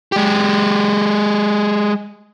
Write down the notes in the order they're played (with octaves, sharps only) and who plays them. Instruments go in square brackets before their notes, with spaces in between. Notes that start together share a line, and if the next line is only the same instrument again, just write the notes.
[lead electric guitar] G#3 G4